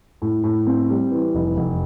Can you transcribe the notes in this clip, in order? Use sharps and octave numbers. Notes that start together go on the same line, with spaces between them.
A2
A2
C4
G3
E3
F1
F1